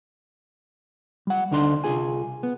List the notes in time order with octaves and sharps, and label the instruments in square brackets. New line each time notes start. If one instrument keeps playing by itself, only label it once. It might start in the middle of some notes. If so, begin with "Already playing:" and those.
[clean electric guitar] G3 F#5
D2 D3 D4 D#4 C6
C2 F4 G#4 G#5
B3